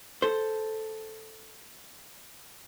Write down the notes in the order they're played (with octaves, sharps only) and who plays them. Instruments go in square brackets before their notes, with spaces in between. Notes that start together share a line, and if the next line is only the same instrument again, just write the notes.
[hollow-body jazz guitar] A4 C5